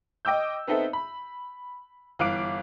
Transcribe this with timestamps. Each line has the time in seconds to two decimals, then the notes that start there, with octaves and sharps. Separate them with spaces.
0.25 D#5 G5 D6 E6 G6
0.67 B3 C4 D#4 A4 E5
0.93 B5
2.19 G1 E3 F5 D6 F#6 D7